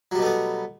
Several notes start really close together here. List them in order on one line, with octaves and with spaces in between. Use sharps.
F#3 G3 B2 A3 B3